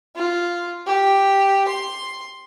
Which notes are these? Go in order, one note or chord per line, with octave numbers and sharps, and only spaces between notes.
F4
G4
C6